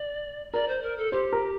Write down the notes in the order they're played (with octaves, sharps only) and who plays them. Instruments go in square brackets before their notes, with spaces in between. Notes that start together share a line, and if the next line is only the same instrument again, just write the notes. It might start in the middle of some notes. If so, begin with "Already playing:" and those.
Already playing: [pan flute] D5
[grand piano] A#4 [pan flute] D5
[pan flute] C5
A#4
A4
[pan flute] G4 [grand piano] C5
[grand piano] A#4